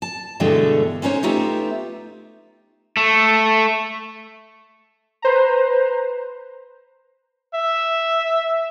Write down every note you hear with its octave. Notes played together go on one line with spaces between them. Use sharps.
A5
G2 B2 D3 E3 G#3 A3
G#3 C#4 D#4 C5 C#5
A3 B3 D#4 F4 G4 E5
A3
B4 C5 A#5
E5